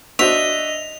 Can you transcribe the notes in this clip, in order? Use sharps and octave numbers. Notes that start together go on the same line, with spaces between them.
D4 F#4 C5 D#5 E5 F7